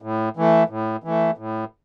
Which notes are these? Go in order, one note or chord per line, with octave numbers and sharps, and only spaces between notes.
A2
E3 A3
A2
E3 A3
A2